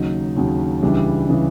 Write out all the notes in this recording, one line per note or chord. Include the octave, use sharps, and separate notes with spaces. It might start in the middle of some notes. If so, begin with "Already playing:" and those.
Already playing: D#2 C#3 F#3 D#4
D#2 C#3 F#3
C#2 C#3 E3 G3 D4
C#3 E3 G3